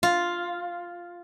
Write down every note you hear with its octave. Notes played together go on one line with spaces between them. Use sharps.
F4